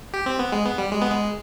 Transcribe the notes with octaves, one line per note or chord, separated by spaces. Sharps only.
G4
C4
B3
G#3
B3
G3
G#3
B3
G#3